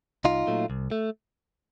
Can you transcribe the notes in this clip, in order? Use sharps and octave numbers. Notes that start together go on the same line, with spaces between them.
C2 D#4 F4
A#2 F#3 A3
C2
A3